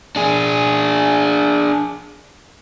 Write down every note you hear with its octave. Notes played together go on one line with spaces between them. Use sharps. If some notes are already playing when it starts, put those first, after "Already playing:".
D4 G#4